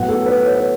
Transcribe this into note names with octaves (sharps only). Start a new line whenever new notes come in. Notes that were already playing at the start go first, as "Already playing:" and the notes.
Already playing: A2 F#3 B3 F#5
A4
B4
C#5
B4